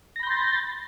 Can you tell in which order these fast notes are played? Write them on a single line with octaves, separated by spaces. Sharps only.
A#6 B5 G6 C6 A6